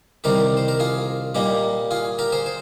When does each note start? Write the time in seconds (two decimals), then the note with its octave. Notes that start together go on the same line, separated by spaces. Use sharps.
0.24 C2 C3 D#3 G3 G4 A#4
0.57 C5
0.68 A#4
0.79 F4 G#4
1.35 A#2 G3 A#3 D#4 G4
1.91 F4 G#4
2.19 G4 A#4
2.32 G#4 C5
2.46 C5